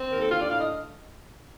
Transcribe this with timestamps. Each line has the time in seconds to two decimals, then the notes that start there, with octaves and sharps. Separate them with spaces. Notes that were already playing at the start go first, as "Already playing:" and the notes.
Already playing: C4
0.10 D#2 A#4
0.20 A4
0.30 D3 F4
0.40 D5
0.49 A2 F5
0.59 D#5